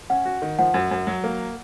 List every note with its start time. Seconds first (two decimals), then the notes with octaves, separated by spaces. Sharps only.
0.10 C#4 F#5
0.25 F#4
0.42 D#3
0.59 F3 F#5
0.74 F#2
0.91 F#2
1.07 F#3
1.24 A#3